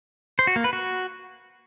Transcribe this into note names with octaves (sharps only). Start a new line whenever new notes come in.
C5
F#4
A#3
B4
F#4